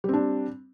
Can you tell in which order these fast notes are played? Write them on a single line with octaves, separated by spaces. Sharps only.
G3 C4 D4